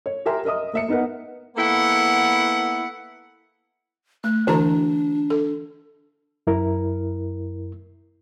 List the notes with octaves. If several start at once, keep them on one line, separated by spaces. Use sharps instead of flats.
C#5
G4 A#4 E5 G#5 A#5 C6
A#4 D#5 E5 D#6
A#3 E5 C#7
B3 D#4 A#4 B4 F#5
A#3 B3 E4 A4 F#5
A3 F#6
D3 E3 D4 E4 F#4 C5 A5
A4
F#2 E4 A#4